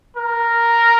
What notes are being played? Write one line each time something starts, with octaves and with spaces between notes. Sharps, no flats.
A#4